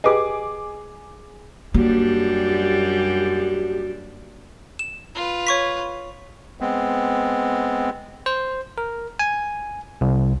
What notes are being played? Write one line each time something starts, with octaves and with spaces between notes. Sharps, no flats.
G4 G#4 B4 D#5 D6
F#2 G3 A#3 D4 F#4 G4
E7
F4 B4
C#5 C#6 B6
G#3 B3 C4
C5
A#4
G#5
C2